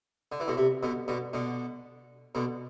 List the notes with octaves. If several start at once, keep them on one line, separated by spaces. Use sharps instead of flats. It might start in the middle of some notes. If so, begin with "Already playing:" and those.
D3
E3
B2 D3
C3
B2 D3
B2 D3
B2 D3
B2 D3